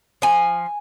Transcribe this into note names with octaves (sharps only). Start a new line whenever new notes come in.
F3 G#5